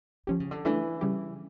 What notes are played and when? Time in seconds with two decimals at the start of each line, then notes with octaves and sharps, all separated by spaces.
0.27 D3 F3 C#4 G4
0.40 C#3
0.51 D3
0.65 E3 A3 D4 A4
1.01 C#3 G3 C#4 G4